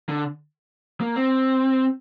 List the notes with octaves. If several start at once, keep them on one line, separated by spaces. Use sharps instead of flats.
D3
A#3
C4